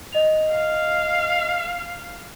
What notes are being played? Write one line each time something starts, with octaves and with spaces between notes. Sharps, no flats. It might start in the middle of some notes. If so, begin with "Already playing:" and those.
D#5 F7
F5